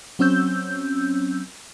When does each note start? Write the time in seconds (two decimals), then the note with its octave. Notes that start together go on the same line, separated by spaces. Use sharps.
0.19 F#3 C4 C#4 E6 G6